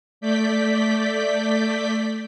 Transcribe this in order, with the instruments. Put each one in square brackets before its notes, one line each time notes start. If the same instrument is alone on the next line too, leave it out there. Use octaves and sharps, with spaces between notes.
[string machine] A3 D5 G6 B6